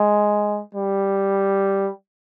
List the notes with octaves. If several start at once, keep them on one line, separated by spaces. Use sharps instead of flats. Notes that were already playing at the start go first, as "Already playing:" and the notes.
Already playing: G#3
G3